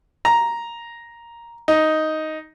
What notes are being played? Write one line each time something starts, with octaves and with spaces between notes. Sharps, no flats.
A#5
D#4